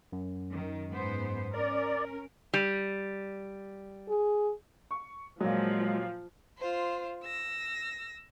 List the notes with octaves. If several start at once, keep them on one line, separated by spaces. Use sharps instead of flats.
F#2
D#3
G#2 B3 C5
C#4 A#4 D5
G3
G#4
C#6
A#2 F3 F#3 G#3
F4 C5
E6 A#6